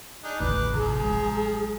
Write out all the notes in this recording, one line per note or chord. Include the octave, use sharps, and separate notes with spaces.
D4 D#4 G#4
A1 E2 D3 B4 D6
C3 F3 G#4 A#5
F#3 G#3